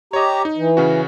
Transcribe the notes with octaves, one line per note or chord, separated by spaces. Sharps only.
G4 C#5 D#5 A#5
D#4
E3
C#3 C#4 F#4